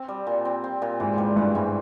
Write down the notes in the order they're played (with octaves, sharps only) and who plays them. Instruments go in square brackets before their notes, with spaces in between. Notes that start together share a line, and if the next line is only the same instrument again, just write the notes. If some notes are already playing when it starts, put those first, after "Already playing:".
Already playing: [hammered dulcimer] C4
G3
A#2
C4
C4
A#2
[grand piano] G#2 [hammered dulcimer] E3
[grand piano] G#2 [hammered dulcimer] G3
[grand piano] G2 [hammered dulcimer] E3
[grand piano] G#2 [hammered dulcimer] E3